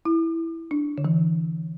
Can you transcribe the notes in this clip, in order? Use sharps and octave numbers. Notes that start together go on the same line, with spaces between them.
E4
D4
D3
E3